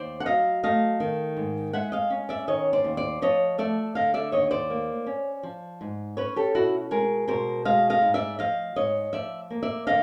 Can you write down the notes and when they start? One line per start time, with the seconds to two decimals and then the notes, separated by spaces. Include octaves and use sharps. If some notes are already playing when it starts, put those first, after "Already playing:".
Already playing: D#2 C5 D5
0.20 F#5
0.26 F#3 D#5 F5
0.63 A3 D#5 F5
1.00 D#3
1.37 G#2
1.73 G#3 E5 F#5
1.92 D#5 F5
2.10 C#4
2.29 D5 E5
2.47 D#3 C#5 D#5
2.73 C5 D5
2.84 D#2
2.97 C5 D5
3.22 F3 C#5 D#5
3.58 A3 D5 E5
3.95 D3 D#5 F5
4.14 D5 E5
4.32 D#2 C#5 D#5
4.51 C5 D5
4.70 A#3
5.07 C#4
5.43 F3
5.81 G#2
6.17 C#4 B4 C#5
6.36 G4 A4
6.55 B2 E4 F#4
6.91 G#3 G#4 A#4
7.28 B2 A#4 C5
7.65 G#3 D#5 F5
7.90 D#5 F5
8.02 G#2
8.14 D5 E5
8.39 F3 D#5 F5
8.76 G#2 C#5 D#5
9.13 F3 D5 E5
9.50 A#3
9.63 D5 E5
9.87 D3 D#5 F5